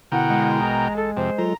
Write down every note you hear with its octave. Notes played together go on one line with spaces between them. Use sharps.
B2 D3 E4 A#4 F#5 G5
G#3
A1 A#5
A4
F2 C3 C5
F#3 F4 A4 A#5